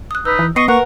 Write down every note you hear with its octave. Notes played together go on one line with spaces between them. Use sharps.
D#6 F#6
D#4 B4 E6
E3
B3 D#5 C#6 C7 C#7 D#7
A#3 A#4 B4 F#5 C#6 F#6